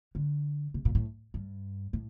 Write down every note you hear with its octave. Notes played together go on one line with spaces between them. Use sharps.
D3
C3
A#2
A2
G2
A2